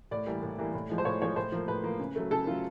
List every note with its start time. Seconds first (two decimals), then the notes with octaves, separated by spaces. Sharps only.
0.11 A2 D5
0.27 E3 G3 A#3
0.43 A2
0.58 E3 G3 A#3
0.74 A2
0.90 F3 G#3
0.98 C5
1.05 A2 C#5
1.21 F3 G#3 C#5
1.36 A2 C5
1.52 F3 A#3
1.68 A2 B4
1.84 F3 A#3
1.99 C#3
2.16 F#3 A3
2.31 C#3 A4
2.46 F#3 A3 F4